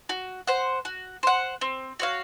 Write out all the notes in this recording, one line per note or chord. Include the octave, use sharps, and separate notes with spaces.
F#4
C5 F#5
F#4
C5 F#5
C4
F#4 C#5 F5